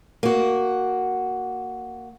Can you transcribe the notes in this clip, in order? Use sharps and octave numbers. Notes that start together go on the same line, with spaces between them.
A#3 F#4